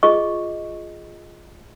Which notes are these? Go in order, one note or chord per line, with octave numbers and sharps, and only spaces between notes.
F4 G#4 D#5 C#6